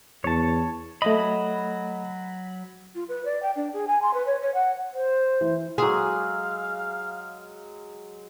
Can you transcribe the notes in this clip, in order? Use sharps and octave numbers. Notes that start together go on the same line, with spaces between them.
E2 C#5 A5
F#3 A3 D#5 B5
F4
B4
D5
G5
D4
G#4
G#5
C6
B4
C#5
C#5
F#5
C5
E3
F#3 G#3 G#4 F5